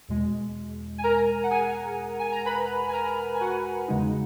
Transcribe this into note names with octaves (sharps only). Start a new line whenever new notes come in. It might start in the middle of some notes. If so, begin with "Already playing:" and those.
E2 B2 G#3
G#5
A#4 A#5
F#5
G#4 G#5
G#5
A#5
B4 B5
G#5
A#4 A#5
G#5
F#4 F#5
E2 C#3 G#3 D#4